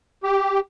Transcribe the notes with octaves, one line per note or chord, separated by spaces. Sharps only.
G4